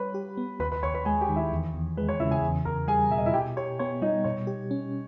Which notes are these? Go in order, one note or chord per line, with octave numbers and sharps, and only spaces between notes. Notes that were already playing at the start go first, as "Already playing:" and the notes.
Already playing: G3 B4 C#5 B5
G4
B3
D#2 B4 B5
B4 B5
D#2 C#5 C#6
B4 B5
G#3 G#4 G#5
G4 G5
D#3
E4 E5
E2
E2
G#3 B4
C#5
C#3 E4 E5
G#4 G#5
E2
E2 A#4 A#5
G3 G#4 G#5
B2 E5
D#5
E4 E5
B2 G4 G5
G4 C#5
B3 C#5
G3 D#4 D#5
B2 C#5
G4
C#4